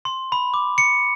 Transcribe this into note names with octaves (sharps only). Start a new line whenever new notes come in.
C6
B5
D6
C#7